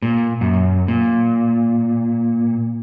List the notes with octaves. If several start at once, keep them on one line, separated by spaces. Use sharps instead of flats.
A#2
F#2
A#2